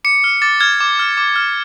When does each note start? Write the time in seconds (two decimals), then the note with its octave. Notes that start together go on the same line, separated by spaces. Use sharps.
0.04 D6 C#7
0.24 F6
0.42 D6 A6
0.61 F6 G#6
0.81 D6
0.99 F6
1.17 D6
1.36 F6